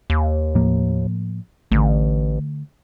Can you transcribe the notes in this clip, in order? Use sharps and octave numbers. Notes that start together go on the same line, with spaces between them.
D#2
A2 F3 A#3
A1 D3 A3